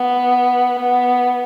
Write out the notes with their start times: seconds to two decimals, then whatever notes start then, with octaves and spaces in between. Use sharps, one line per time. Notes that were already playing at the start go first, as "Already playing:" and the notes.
Already playing: B3
0.78 B3